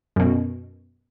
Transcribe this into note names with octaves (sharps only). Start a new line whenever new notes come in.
F#2 B2